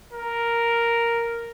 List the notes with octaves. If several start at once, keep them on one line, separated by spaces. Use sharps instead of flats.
A#4